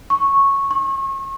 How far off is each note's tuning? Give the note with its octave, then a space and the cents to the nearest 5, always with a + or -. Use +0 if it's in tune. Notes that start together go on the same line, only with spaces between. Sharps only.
C#6 -10
C#6 -35